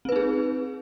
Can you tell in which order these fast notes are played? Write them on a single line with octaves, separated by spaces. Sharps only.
C4 B4 D#4 G#4